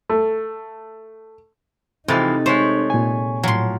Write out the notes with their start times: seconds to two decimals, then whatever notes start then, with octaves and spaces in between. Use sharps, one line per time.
0.09 A3
2.08 C3 E3 F3 G#3 C4 D#4 A4 A6
2.46 G#3 A3 C5 C#5
2.90 A#2 G#5
3.43 A2 F3 F#3 C6